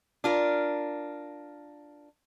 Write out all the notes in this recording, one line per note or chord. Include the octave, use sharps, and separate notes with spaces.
D4 F4 A#4